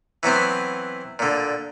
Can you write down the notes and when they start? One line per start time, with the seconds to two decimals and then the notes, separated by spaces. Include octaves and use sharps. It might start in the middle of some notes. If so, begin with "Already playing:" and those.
0.23 E3 F#3 B3 C4
1.19 A#2 D3